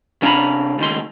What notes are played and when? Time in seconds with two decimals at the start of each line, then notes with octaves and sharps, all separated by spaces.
0.22 C3 D4 F5 G5 A#5 B5
0.78 C#2 D#3 C6